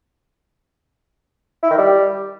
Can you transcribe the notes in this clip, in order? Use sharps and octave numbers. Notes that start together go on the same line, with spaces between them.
E4
D#3
G3